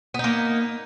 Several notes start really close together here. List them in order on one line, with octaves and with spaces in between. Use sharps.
B3 D#4 A#3